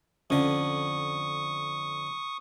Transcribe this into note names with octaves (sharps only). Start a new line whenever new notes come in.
F2 D3 C#4 C#6 D#6